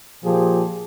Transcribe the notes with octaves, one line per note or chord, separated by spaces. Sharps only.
A#2 F3 G4 G#4